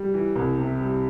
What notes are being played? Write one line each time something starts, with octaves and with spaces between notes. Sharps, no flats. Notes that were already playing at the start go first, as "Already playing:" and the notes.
Already playing: G3
E3
C2
C3
G3